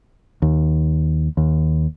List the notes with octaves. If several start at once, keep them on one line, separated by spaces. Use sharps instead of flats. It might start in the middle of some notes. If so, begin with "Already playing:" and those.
D#2
D#2